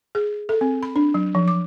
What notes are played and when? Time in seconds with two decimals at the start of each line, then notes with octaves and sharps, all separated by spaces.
0.15 G#4
0.49 A4
0.61 C4
0.83 B5
0.96 D4
1.14 F#3
1.35 F3
1.48 D6